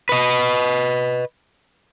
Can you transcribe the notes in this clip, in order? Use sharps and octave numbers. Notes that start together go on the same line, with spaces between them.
B4 D#5